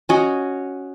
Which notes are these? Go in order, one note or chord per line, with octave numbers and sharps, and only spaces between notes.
C#4 F#4 D#5